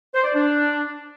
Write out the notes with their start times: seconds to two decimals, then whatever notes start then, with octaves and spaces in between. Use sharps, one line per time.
0.14 C5
0.24 D5
0.33 D4